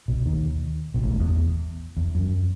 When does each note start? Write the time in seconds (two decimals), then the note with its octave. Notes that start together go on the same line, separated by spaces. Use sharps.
0.08 B1 B2
0.26 D#2 D#3
0.94 B1 B2
1.03 A1 A2
1.11 G1 G2
1.20 E2
1.97 E2
2.15 F#2